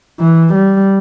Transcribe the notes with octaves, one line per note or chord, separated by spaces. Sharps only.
E3
G3